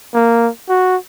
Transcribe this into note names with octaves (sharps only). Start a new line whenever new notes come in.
A#3
F#4